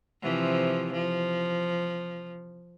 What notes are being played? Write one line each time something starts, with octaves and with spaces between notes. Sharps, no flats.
C3 E3 F3
F3